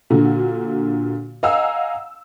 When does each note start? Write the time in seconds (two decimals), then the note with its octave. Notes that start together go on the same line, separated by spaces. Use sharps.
0.10 A#2 D3 F#4
1.43 D#5 F5 F#5 G#5 A#5 E6